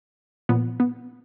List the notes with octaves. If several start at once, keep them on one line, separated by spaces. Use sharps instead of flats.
A#2 F3 B3
B3